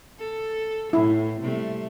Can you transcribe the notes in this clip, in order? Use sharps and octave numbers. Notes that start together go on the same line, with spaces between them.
A4
A2 E4
C3 G3 A3